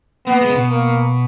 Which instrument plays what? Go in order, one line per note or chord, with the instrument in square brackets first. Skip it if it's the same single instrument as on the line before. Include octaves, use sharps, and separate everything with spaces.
[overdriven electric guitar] A#3 [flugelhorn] B3
[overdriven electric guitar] G#3
C#3
B2
[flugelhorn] A#3